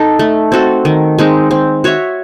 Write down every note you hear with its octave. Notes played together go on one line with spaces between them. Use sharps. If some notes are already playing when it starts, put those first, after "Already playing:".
Already playing: D#4 A4
A3
C4 F#4 A4
D#3
G#3 C4 D#4
C4
F#4 C#5 E5